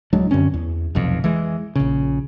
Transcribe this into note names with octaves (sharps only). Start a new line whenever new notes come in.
D1 F#3 G#3 D4
F#2 D3 C4 C#4
E2
F1 B1 F2
E3 G#3
A#1 C#3